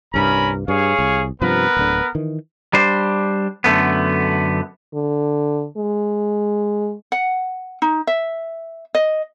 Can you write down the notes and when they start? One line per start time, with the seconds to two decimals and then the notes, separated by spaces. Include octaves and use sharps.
0.14 C2 G2 C3 C#4 A#4 B5
0.68 G2 G#4 C#5 F5
0.99 C2
1.41 G2 C3 F3 B3 A#4 B4
1.77 D1 D3
2.15 D#3 E3
2.73 G3 D4 C5
3.64 F#2 D3 A3 B3
4.94 D3
5.77 G#3
7.12 F#5
7.82 D#4
8.07 E5
8.95 D#5